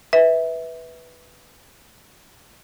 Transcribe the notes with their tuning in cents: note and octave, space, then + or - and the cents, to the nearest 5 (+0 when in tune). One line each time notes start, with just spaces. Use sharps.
B4 +0 E5 -20